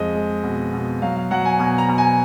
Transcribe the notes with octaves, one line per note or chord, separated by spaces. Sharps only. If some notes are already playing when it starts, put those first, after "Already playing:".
Already playing: F2 G#3 D#5
G#3
B2
B2
F#3 F5
F5
F#3 F#5
G#5
B2 G#5
A#5
B2
G#5